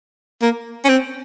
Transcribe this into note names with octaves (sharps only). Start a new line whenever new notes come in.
A#3
C#4
C4